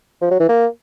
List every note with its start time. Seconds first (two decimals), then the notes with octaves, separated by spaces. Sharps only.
0.22 F3
0.31 F#3
0.40 E3
0.49 A#3